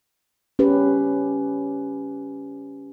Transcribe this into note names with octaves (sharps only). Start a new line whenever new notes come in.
C#4 G4 B4